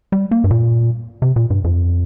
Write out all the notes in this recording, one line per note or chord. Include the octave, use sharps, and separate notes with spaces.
G3
A#3
G2
A#2
C3
A#2
G2
F2